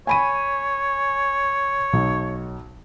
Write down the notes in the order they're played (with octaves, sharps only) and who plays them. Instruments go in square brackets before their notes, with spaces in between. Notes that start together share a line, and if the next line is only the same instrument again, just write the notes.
[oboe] C#5 [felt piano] G#5 B5 D#7
[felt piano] B1